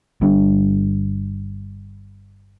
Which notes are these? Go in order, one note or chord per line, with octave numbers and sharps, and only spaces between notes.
G1 G2 G3 D4